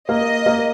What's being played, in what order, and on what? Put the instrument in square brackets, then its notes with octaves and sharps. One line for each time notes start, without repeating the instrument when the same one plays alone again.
[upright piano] A#3 [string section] D#5
[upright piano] A#3